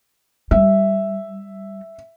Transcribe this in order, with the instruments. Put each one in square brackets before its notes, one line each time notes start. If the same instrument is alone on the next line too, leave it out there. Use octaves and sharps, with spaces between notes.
[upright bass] G3 [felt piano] E5